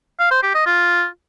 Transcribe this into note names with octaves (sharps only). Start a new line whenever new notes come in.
F5
C5
G4
D#5
F4